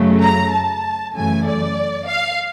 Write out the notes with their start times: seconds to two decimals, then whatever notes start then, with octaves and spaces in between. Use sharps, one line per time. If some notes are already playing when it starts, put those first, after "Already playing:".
Already playing: F#2 C#3 F#3 A3
0.21 A#5
0.52 A5
1.14 F#2 C#3 E3 A3 G#5
1.45 D5
2.07 F5